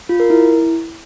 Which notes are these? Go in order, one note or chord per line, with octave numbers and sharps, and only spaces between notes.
F4
A#4
E4